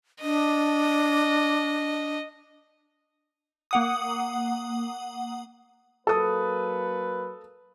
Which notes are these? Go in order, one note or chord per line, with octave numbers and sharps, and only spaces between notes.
D4 D#5
A#3 F#5 D#6
F#3 A#3 A4 B4 D#6